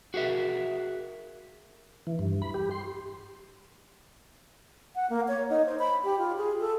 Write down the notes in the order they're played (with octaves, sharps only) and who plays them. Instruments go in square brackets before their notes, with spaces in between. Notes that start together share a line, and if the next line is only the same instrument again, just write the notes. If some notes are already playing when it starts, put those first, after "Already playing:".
[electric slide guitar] F#4 G#4 A#4 E5
[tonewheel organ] E3
G2
B5
G4
C6
[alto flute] F#5
A#3
C#5
D#4
C5
B5
G4
F4
G#4
A4